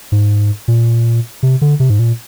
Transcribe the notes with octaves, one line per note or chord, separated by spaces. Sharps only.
G#2
A#2
C3
D3
C3
G#2
A#2